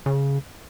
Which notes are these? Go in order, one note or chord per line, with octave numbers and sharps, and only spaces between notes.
C#3